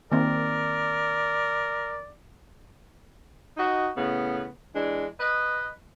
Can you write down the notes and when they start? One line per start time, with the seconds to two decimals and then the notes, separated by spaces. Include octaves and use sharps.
0.12 D#3 A#3 C4 A#4 D5
3.56 D#4 F#4 D#5
3.95 A2 C#3 B3
4.73 E3 G#3 D4
5.18 B4 D#5